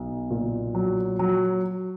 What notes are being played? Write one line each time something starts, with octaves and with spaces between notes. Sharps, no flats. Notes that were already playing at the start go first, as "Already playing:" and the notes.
Already playing: B1
A#2
F#3
F#3